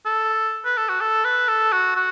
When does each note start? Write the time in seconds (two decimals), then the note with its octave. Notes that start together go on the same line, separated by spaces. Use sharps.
0.06 A4
0.65 B4
0.77 A4
0.89 F#4
1.01 A4
1.25 B4
1.48 A4
1.72 F#4
1.96 F#4